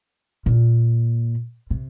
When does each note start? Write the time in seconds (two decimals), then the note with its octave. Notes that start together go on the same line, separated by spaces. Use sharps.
0.46 A#2
1.70 C3